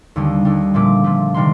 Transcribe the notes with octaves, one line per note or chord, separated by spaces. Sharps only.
D#2 D3 G3
D#2 D3 G3
A#2 F3 A3 D6
A#2 F3 A3
C3 D#3 G3 C6